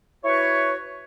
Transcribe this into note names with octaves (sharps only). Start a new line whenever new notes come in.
E4 F#4 B4 C#5